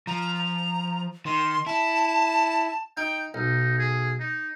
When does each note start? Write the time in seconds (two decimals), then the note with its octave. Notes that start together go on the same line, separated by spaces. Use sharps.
0.07 F3 A#5
0.34 A#5
1.26 D#3 C6
1.67 E4 A5
2.97 D#4 G5
3.34 B1 D#4
3.78 G#4
4.20 D#4